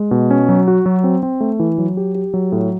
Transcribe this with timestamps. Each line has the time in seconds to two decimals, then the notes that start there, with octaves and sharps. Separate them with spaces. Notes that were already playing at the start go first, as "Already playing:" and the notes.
Already playing: G#3
0.11 B2
0.31 C#4
0.49 F#3
0.68 F#4
0.86 F#3
1.04 C4
1.23 C4
1.41 A3
1.59 E3
1.78 F#3
1.97 G4
2.15 G4
2.34 F#3
2.52 A2